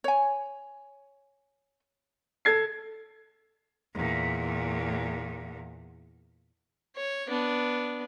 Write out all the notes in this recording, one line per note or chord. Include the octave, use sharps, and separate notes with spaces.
C#5 G#5
A4 G#6 C7
E2 A#2
C#5
B3 D4